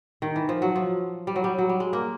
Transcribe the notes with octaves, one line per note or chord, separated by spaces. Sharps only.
D#3
E3
F3
F#3
F3
G3
F#3
G3
F#3
G3
G#3
A#3